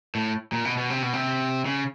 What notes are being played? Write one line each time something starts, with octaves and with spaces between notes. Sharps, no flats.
A2
A#2
B2
B2
C3
B2
C3
C#3